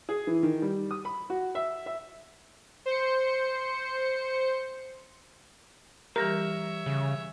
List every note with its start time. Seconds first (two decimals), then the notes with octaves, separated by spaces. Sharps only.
0.09 G#4
0.27 E3
0.43 D#3
0.62 G3
0.91 D#6
1.05 B5
1.30 F#4
1.55 E5
1.86 E5
2.86 C5 C#7
6.16 E3 G3 G4 A#4 C#5 E5
6.86 C#3